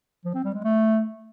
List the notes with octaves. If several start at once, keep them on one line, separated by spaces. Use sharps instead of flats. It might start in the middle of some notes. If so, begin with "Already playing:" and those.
F3
C4
G3
G#3
A3